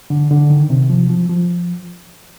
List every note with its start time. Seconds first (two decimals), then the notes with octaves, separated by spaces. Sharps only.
0.10 D3
0.30 D3
0.50 D#3
0.70 C3
0.90 F3
1.10 F3
1.29 F3